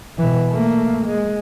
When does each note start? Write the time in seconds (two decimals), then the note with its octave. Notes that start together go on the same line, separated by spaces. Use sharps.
0.18 B2 E3
0.49 A3 A#3
1.06 G#3